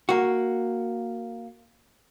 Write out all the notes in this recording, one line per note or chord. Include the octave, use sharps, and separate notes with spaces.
A#3 F#4